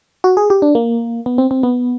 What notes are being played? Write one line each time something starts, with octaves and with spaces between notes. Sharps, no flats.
F#4
G#4
G4
D4
A#3
B3
C4
C4
B3